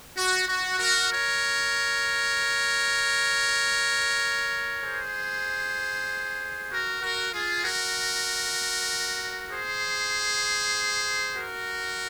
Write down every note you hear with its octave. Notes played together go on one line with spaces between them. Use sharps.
F#4
F#4
F#4 A#4
A#4 C#5
G#4 C5
F#4 A#4
F#4 A#4
F4 G#4
F#4 A#4
G#4 C5
F#4 A#4